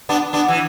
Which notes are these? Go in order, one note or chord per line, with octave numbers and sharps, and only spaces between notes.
B3 D4
B3 D4
E3